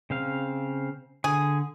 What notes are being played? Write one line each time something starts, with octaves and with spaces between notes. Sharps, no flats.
C#3 C4 F5
D3 G#4